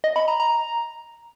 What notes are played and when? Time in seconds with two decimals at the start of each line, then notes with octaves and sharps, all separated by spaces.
0.04 D#5
0.16 B5
0.28 A#5
0.40 A#5